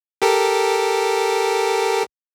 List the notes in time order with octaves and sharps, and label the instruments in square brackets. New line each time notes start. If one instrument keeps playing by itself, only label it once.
[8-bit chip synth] G4 A4 A#4